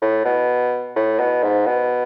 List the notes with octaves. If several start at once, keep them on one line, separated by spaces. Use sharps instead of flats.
A2
B2
A2
B2
G#2
B2